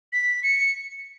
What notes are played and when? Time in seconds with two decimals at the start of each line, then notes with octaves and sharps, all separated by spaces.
0.13 B6
0.43 C#7